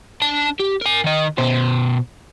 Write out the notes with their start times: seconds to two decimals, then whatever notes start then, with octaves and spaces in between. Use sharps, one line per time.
0.22 D4 A5
0.59 G4
0.81 A#4 G#5
1.04 D#3 D#5
1.38 B2 C5